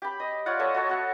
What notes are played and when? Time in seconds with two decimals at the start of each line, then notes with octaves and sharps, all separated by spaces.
0.02 G4 B5
0.20 D#5
0.46 F4 C#5 D5 F#5
0.59 A4 C#5 D#5 E5
0.74 F#4 A4 C#5
0.89 F#4 A4 F#5